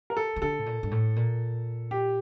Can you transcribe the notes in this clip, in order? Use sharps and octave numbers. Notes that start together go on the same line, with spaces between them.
A#4
A4
E3
D3 A4
A2
A#2
G2
A2
A#2
G4